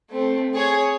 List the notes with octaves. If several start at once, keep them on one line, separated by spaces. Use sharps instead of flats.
A3 C4
G#4 C#5